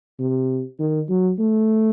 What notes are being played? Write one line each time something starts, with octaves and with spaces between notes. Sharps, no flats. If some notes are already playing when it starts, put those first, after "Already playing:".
C3
D#3
F#3
A3